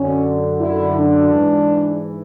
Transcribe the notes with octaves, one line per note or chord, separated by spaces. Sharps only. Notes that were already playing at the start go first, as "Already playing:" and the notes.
Already playing: F#2 D3 C#4
E4
D4
G#2 E3